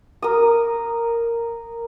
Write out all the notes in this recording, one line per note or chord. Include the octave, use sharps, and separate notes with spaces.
A#4 D#6